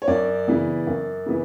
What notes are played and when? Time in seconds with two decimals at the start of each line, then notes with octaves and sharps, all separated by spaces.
0.02 C#5
0.08 F#2 D5
0.47 C#3 E3 B3
0.87 F#2
1.26 C#3 E3 B3